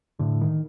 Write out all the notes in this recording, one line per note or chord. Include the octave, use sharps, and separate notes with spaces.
A2 D3
D#3